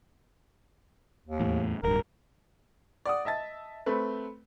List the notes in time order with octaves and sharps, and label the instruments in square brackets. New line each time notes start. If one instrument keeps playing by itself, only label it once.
[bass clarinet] D#2
[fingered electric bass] E2 A2
[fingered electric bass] D1 G2 [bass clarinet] A#4
[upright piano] D5 F#5 D#6
D#5 E5 A5 A6
A3 C4 B4